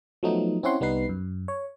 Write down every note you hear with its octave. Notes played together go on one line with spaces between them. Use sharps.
F3 F#3 A3 B3 D#4
C4 C#4 E4 C#5 F#5 C6
C2 G3 B3 D#4 B4 C7
F#2
C#5